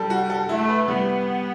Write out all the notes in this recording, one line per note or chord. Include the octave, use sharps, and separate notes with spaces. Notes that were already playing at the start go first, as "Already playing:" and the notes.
Already playing: G3 A4
F#4
A4
A3 E4
B4
G3 B3